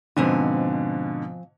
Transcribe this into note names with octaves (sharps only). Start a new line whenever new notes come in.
G#2 B2 D3 F3 C4 G#5